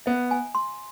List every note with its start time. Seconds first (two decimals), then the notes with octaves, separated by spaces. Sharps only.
0.06 B3 E5
0.31 G#5
0.55 C6